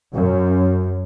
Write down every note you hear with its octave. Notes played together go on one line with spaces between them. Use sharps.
F#2